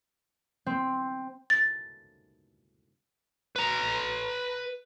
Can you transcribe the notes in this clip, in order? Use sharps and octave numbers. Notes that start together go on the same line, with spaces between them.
C4
A6
B4 A#5